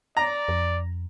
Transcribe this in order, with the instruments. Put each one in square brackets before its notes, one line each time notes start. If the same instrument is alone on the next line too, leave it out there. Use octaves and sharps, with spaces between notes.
[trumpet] D5 [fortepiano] A#5
[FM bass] F2